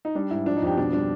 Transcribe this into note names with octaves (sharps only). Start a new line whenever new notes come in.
D#4
G3 D4
G#2 E4
F3 D4
D#4
F2 G4
B2 D4
G3 D4